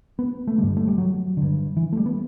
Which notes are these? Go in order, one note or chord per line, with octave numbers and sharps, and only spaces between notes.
B3
A3
G2 D3 G3
A3
G3
F#3
G2 D3
E3
A3
G3
B3